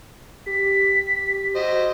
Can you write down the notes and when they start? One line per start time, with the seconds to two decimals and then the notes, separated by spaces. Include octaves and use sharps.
0.46 G4 B6
1.55 F#4 C5 D#5